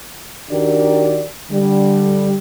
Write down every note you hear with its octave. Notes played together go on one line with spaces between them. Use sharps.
D#3 D4 F#4 G4 A#4 D5
D3 G3